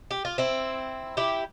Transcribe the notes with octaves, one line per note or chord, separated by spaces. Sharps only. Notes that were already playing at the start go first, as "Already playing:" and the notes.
G4
F4
C4 E4
E4 G4